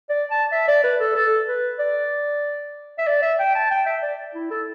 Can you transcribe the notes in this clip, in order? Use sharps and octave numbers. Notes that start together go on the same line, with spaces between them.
D5
A5
E5
D5
B4
A4
A4
B4
D5
E5
D5
E5
G5
A5
G5
E5
D5
E4
A4